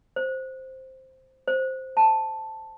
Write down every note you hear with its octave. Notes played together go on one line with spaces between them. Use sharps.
C5
C5
A5